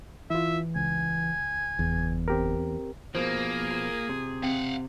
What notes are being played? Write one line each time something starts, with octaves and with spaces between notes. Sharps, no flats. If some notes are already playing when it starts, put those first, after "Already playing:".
E3 E4 F4 E5
C#2 G#5
F#1 E2
C4 G4 A#4
B2 F3 A#3 G#4 C5
F4
C3
C4 F5 F#5